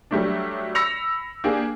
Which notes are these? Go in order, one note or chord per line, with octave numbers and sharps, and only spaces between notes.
F#3 G3 A3 D4
B5 E6 A#6 C#7 F7
A#3 D4 G4 G#4